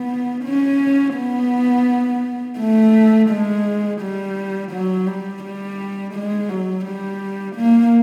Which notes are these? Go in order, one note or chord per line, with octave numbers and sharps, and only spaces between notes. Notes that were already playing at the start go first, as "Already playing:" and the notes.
Already playing: B3
C#4
B3
A3
G#3
G3
F#3
G3
G3
G#3
F#3
G3
A#3